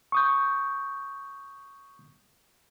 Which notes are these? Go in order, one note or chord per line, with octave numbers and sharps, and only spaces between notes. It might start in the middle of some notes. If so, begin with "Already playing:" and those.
C#6 D#6 G6